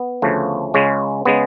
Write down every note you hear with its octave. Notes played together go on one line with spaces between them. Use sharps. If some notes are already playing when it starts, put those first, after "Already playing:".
Already playing: B3
D2 C#3 F3 A3
C#2 C#3 G#3 C#4
C#3 G#3 B3